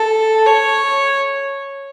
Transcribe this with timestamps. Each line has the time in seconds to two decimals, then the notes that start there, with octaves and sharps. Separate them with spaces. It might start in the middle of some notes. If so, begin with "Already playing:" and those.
Already playing: A4
0.46 C#5